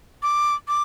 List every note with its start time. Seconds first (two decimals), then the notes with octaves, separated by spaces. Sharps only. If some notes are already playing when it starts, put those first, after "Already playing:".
0.23 D6
0.68 D6